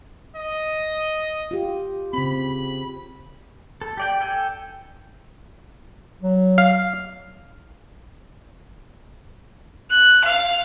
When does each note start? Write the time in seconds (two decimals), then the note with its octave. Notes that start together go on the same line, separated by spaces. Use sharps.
0.35 D#5
1.51 F4 G4
2.13 C#3 C4 B5
3.82 A4
3.97 G4 D5 G5
4.21 A4 G5 G#5
6.22 F#3
6.58 F5
9.91 F#6
10.25 F5